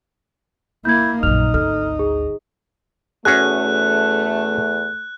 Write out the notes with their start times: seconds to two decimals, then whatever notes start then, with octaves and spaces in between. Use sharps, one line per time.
0.85 A#3 E4 G6 G#6
1.23 A#1 F#2 D#4 F6 F7
1.54 G#1 D2 A4 F6
1.99 G#4
3.25 E2 A3 C#4 F#4 G#4 F#6